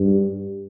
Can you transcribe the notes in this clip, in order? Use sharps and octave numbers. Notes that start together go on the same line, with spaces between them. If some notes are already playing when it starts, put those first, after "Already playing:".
Already playing: G2